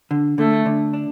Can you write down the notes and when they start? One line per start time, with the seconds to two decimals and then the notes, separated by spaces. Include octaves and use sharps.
0.11 D3
0.38 D3 A3
0.66 D3
0.94 D4